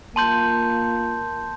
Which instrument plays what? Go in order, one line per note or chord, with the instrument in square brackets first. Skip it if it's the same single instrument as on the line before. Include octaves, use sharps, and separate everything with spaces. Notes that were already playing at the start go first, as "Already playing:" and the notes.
[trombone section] A#3 F4 [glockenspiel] A5 C6 G6